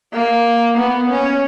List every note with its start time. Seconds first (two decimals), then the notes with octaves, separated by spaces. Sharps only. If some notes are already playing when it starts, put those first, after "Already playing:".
0.13 A#3
0.77 B3
1.09 C#4